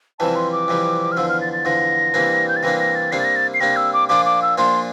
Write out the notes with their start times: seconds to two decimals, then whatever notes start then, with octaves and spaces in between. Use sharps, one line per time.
0.19 F2 C3 E3 G3 A5
0.36 C6
0.52 D6
0.68 F2 C3 E3 G3
1.12 F6
1.17 E2 D3 F3 E6
1.29 F6
1.41 A6
1.53 A6
1.65 E2 D3 F3 A#6
2.14 C3 E3 G3 A#3 D4
2.49 G6
2.56 A6
2.63 C3 E3 G3 A#3 D4 A#6
2.80 A#6
2.95 A6
3.12 C3 G3 A#3 D4 C7
3.20 A6
3.24 A#6
3.36 A6
3.54 C7
3.60 C3 G3 A#3 D4 A#6
3.76 E6
3.93 D6
4.09 A#2 F3 A#3 D4 F4 D6
4.26 D6
4.42 E6
4.58 A#2 F3 A#3 D4 F4 C6